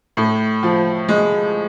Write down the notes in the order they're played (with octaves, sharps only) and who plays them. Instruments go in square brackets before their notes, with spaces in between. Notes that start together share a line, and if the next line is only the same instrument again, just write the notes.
[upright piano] A2
F3
G#3